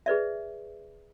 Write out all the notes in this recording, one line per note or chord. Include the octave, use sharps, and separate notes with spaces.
G#4 B4 D5 E5